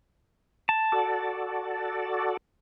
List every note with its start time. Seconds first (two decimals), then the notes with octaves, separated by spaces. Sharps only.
0.69 A5
0.92 F#4 A4 D5